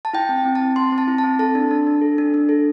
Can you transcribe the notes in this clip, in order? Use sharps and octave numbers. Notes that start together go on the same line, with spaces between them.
A5
E4 G5
C4
C4
A5
C4
C4 C6
C4
A5
E4
A5
C4
A4 A5
D4
D4
D4
A4
D4
D4
A4